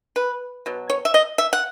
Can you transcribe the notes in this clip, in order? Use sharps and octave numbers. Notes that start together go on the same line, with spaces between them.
B4
B2 F#3
C#5
E5
D#5
E5
F#5